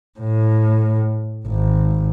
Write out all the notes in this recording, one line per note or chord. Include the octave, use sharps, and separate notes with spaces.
A2
G#1